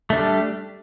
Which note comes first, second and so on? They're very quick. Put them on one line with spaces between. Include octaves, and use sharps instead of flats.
A3 D4 G3